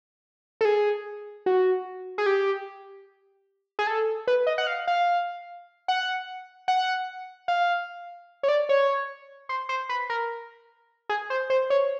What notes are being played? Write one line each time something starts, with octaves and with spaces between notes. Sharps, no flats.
A4
G#4
F#4
G#4
G4
G#4
A4
B4
D#5
F#5
F5
F5
F#5
F#5
F5
C#5
D5
C#5
C5
C5
B4
A#4
G#4
C5
C5
C#5